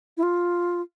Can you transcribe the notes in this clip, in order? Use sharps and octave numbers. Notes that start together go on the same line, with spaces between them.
E4
F4